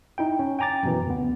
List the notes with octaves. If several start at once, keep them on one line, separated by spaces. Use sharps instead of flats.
D#4 E4 G5
C#4
G5 G#5 A#5 D6 A6
F#2 B2 E3
D2 B3